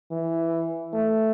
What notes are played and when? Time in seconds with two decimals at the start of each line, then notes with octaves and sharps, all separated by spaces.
0.11 E3
0.94 A3